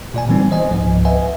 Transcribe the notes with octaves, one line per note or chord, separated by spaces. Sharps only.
A#2 D5 G#5
D3 E3 G3 B3 C4 D#4
C5 D#5 G#5
C#2 G#2 F3
B4 D#5 E5 F#5 G#5